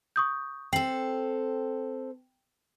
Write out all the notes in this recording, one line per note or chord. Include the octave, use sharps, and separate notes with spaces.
C#6 D#6 G6
C4 A4 G5 C7 F#7